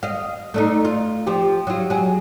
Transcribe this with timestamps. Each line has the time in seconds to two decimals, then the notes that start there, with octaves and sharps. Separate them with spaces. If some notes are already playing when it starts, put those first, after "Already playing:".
0.03 D#5 F5
0.54 A3 D4 D#4
0.85 F4
1.27 F3 G4
1.67 F#3 F4
1.90 F#3 G#4